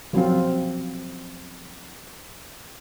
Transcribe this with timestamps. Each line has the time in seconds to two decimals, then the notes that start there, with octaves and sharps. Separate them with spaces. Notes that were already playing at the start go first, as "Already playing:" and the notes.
0.13 F3 F#3 C4 F4